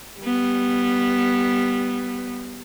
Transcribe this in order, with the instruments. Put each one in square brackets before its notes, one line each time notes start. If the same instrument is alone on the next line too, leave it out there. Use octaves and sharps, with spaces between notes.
[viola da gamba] G3 B3